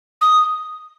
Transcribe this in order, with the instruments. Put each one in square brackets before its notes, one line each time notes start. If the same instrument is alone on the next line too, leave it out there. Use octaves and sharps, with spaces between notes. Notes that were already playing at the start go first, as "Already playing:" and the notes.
[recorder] D#6